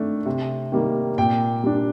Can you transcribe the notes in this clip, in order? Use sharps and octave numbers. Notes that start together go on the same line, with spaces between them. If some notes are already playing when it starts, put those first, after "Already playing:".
Already playing: D#3 A3 D4
C3
D#3 G3 A#3
A#2 G5
G3 D4